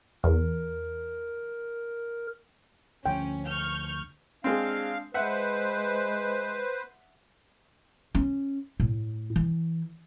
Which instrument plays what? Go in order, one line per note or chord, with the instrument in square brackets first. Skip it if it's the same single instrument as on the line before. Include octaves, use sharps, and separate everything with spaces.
[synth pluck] E2 [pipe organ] A#4
[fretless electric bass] D2 D3 F3 [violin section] C#4 [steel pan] G5
[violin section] C#6 F6 G6
[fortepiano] G#3 C4 [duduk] D4 [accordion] F5
[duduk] G#3 [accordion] B4 C5 [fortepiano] E5 F#5
[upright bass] C#4
A2
E3